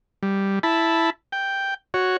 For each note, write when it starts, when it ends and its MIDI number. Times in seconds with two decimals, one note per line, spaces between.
0.23 0.59 55
0.63 1.10 64
0.63 1.10 81
0.63 1.10 83
1.32 1.74 79
1.94 2.17 66
1.94 2.17 73